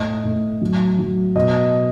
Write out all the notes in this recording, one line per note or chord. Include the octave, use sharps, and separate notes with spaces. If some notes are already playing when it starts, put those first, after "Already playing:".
Already playing: A2 D#5
A2
F#3
F#3
B2 D#5